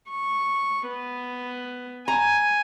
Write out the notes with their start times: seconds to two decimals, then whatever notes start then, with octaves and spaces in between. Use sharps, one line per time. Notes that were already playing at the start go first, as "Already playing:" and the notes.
0.11 C#6
0.88 B3
2.08 G#5 A#5